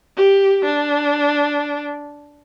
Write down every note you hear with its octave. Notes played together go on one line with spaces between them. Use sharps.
G4
D4